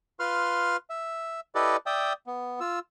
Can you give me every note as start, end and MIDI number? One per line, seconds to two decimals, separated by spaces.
0.20 0.77 65
0.20 0.77 71
0.20 0.77 84
0.20 0.77 89
0.90 1.40 76
1.55 1.77 64
1.55 1.77 67
1.55 1.77 69
1.55 1.77 71
1.55 1.77 74
1.55 1.77 75
1.86 2.13 74
1.86 2.13 76
1.86 2.13 79
1.86 2.13 87
2.27 2.60 59
2.60 2.79 65
2.60 2.79 88